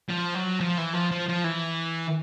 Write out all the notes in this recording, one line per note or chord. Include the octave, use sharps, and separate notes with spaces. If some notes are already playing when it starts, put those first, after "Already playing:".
F3
F#3
F3
E3
F3
F3
F3
E3